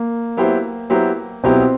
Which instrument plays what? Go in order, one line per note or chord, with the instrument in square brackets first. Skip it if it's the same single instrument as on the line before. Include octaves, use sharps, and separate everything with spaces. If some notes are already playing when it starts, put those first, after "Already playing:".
Already playing: [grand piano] A#3
[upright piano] F#3 B3 E4 G4 C5
F#3 B3 E4 G4 C5
[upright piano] B2 F#3 B3 E4 G4 [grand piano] C4